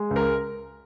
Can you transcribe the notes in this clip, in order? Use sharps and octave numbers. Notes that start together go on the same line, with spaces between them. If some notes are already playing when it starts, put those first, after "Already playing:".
Already playing: G#3
C#2
A#4